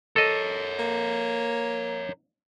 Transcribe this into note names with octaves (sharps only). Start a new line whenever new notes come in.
A4 A#4 C#5 D#5
A#3